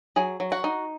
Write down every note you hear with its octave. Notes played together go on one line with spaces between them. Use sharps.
F#3 G#4 G#5
F#3
F#4 F#5
D#4